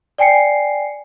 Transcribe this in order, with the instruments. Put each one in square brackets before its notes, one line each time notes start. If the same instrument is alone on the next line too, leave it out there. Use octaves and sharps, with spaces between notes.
[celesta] D5 G5 G#5 C7 C#7